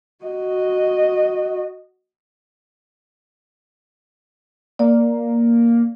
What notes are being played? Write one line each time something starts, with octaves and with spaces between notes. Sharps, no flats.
F#4 D#5
A#3 D5